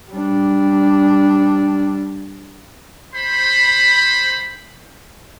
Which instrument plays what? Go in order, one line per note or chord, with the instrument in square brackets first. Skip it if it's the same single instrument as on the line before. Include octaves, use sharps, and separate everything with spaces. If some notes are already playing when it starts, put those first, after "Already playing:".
[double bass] G3 D4
[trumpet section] C5 B5